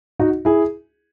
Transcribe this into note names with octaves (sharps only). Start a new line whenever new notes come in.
D#4 F#4
E4 G#4